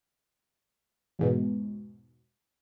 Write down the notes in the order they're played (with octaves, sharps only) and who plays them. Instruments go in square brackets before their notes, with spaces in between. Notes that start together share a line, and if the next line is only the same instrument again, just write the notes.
[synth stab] E2 G#2 B2